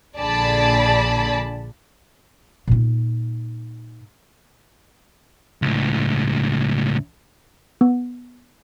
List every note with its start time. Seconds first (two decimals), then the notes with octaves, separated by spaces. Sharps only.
0.19 A#1 D3 G#4 D5 A5 B5
2.67 A#2 D#4
5.62 C#2 A2
7.81 B3